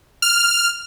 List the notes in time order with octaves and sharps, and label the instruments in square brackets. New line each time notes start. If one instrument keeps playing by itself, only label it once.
[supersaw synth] F6